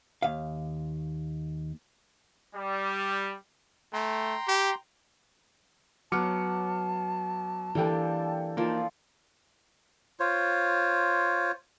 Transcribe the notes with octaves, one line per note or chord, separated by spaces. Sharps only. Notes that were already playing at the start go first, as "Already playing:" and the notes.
D#2 F5
G3
A3 G5 A#5 C6
G4
F#3 B3 B4 C#5 A5 D6 F6 C#7
E3 G3 A#3 D4 A4 G5
F3 A#3 D#4 D5
F4 C5 C#5